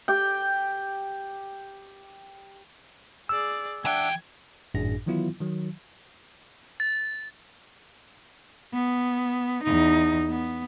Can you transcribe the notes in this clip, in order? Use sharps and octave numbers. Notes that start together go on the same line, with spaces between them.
G4 G5
G#4 D5 E6
E3 D4 E5 F#5 G5 G#6
G#1 F#2 A2 D4 G#4 A#6
D#3 E3 F#3 B3 E4 F4
D#3 F#3
A6
B3
E2 D#4
B3